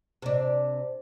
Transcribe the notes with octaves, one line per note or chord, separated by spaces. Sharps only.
C3 D4